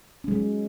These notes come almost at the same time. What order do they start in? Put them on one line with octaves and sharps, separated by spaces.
C#4 G#3 F#3